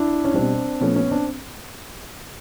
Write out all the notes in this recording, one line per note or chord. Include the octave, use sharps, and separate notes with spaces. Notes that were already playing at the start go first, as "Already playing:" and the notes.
Already playing: D4 E4
C#4
B2 G3 C4 D4
A#2 F3 A3 B3 C#4
B3 C#4
C4 D4